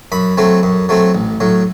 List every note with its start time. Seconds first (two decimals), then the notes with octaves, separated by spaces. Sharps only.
0.12 F#2 B5
0.38 F#3 A3 C4
0.63 F#2
0.89 F#3 A3 C4
1.15 A1
1.40 A2 F#3